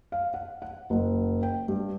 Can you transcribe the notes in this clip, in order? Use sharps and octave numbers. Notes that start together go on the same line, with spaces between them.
F5
F#5
F#5
F#1
G5
G2